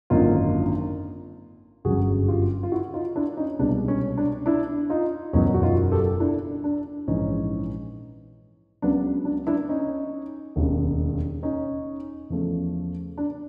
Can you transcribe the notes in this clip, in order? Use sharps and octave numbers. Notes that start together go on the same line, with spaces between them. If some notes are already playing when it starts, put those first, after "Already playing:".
G#1 F#2 D3 F#3 A#3 D#4 F4
G1 F#2 C#3 F#3 F#4 G#4
F4 G4
F4
E4 F#4
D#4 F4
D4 E4
C#4 D#4
C2 B2 G#3 B3 D4
C#4
D4
D4 E4
D#4 F4
F#1 E2 B2 F#3 B3 C#4 D#4
F#4
D#4 F4
G4 A4
D4 E4
D4
A#1 G#2 E3 C#4 D#4
C#2 C#3 F#3 B3 D4
D4
D4 E4
C#4 D#4
E1 D#2 C#3
C#4 D#4
E2 C#3 F3 A3
D4